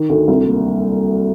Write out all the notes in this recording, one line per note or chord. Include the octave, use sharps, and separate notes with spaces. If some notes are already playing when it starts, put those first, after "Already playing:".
Already playing: D#3
D2
C2
A#3